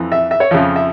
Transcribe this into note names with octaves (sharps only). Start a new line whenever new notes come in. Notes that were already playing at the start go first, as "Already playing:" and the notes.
Already playing: F2 E3
E5
E5
C#5
F2 C#3 F3 E5
E5